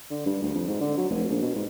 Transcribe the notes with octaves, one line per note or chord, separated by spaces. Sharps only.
D3
G2
D2
F2
G#2
D3
F#3
F1
A#1
B2
G#2